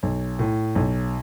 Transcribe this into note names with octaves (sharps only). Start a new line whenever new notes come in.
B1
A2
B1